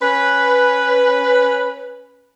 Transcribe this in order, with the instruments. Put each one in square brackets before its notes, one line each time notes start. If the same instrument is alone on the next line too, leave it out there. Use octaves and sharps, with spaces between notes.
[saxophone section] C#4 B4